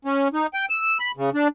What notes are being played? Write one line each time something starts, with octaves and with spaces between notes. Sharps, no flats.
C#4
D#4
G5
E6
B5
C#3
D4